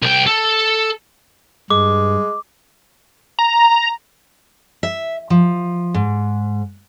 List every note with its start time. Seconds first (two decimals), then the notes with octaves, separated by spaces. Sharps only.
0.02 C2 G5
0.27 A4
1.70 G2 G#3 D6
3.39 A#5
4.83 E5
5.30 F3
5.94 G#2